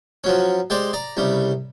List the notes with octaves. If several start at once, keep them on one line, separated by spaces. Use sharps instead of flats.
F3 F#3 C#4
G#3 G4 C5 D5
D5 A#5
C2 C#3 G3